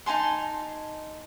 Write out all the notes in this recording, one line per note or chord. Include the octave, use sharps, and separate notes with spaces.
D#4 G#5 A5 C6